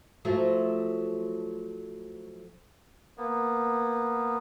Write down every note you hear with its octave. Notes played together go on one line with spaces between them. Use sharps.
F3 F#3 A3
A#3 B3